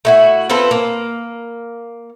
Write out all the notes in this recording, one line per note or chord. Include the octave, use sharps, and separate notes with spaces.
A3 E4 F#4
C4 F4 A4 B4
A#3